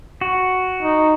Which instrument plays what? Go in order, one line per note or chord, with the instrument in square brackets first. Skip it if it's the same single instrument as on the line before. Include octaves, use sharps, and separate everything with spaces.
[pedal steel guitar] F#4
[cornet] D#4